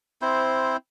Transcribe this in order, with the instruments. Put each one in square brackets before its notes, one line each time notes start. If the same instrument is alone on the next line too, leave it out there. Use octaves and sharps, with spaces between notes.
[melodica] C4 E4 C5